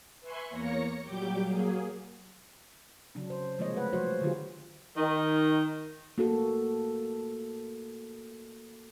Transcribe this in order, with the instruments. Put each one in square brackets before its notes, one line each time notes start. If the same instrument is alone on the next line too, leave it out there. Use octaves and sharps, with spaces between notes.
[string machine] B4 E5 G#5 C6 C#6 F#6
E2 A#3 C#5 A#6 C#7
A#2 F#3 G3 G4 D6 G6
F#3 A#3 G#4
[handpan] C#3 F#3 D4
C#3 C5
C3 F3 G#3 A#3 C#5 D#5
A3 B4 F#5
F3 F#3 G#3 F#4 C5 C#5
D3 D#3 F#3 F4 G4 G#4
[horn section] D#3
[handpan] A#3 F#4 A4